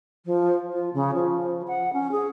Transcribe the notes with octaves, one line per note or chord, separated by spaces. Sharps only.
F3
F4
C#3
F3
F#5
C#4
G#4